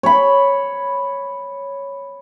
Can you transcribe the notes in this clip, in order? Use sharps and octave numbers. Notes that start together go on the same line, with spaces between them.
C#5 B5